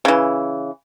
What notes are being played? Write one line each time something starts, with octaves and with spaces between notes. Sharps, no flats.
C#3 E3